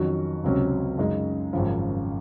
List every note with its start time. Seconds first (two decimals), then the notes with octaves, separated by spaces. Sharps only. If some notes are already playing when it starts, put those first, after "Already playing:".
Already playing: F2 D#3 F#3 C#4 F#4
0.44 C#2 C3 F#3 C#4
0.98 F#2 C#3 G#3 D#4
1.53 G#1 F#2 C#3 F3